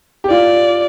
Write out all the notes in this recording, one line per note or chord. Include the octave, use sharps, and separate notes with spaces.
G4
F4 D5